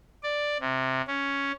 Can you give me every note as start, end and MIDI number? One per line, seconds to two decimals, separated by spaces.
0.23 0.57 74
0.60 1.01 48
1.08 1.52 61